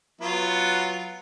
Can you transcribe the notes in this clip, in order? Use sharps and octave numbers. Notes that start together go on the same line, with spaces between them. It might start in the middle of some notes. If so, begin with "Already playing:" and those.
F#3 B3 F4